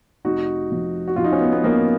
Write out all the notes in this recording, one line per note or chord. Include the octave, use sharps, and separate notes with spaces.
F1 D#4 F#4
F3
F#4
F3 F4
D#4
C#4
B3
B3
F3 A#3 C#4